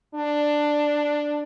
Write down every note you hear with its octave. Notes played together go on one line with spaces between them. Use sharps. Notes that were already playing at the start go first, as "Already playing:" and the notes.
D4